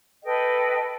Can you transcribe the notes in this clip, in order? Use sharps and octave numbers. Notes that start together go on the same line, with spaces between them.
A4 B4 D#5 G5